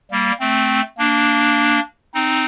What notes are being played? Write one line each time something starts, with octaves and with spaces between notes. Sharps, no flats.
G3 A#3
A3 C4
A#3 D4
C4 D#4